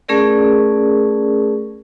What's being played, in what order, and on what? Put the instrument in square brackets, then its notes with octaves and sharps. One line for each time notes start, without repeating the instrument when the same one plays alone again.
[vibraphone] A3 C#4 G#4 A#4 D5